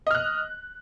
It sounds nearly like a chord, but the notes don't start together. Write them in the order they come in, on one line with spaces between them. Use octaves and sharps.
D#5 F6 F#6